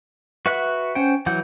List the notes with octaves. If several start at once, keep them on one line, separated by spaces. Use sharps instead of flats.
F#4 B4 E5 F#5 F#6
C#4 C5 F#5 G5
E3 F#3 F#5 G6